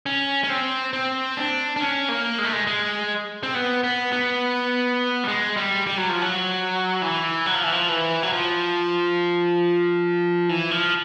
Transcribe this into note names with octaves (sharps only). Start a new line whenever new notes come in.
C#4
C#4
C4
C4
D4
D4
C#4
A#3
G#3
A3
G#3
G#3
C4
B3
B3
B3
G3
G#3
G3
G3
F#3
F3
F#3
E3
F#3
F3
E3
F3
E3
F#3
F3
E3
F3